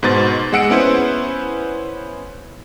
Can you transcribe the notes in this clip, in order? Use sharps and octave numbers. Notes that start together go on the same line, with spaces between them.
G#2 B2 C5 A6
G#3 G#4 F#5 E6 C#7 D7
B3 C#4 E4 B4 C5